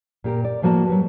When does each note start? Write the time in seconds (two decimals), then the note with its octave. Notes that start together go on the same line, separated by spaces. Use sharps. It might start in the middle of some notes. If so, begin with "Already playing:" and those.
0.24 A#2 G4 A#4
0.45 D5
0.62 A2 F3 A#3 F#4 A#4 A5
0.87 F#3 G3 B4